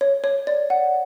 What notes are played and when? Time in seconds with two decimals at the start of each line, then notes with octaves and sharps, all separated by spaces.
0.01 C#5
0.24 C#5
0.47 D5
0.70 F#5